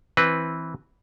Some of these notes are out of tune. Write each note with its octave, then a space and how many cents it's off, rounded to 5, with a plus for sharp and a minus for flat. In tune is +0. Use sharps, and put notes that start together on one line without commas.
E3 -10 C4 +0 B4 +0